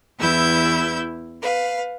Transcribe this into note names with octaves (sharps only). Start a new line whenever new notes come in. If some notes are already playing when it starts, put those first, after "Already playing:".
E2 E3 E4 E6 G6
B4 F5